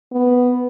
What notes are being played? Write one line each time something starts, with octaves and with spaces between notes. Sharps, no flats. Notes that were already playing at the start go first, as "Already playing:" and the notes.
B3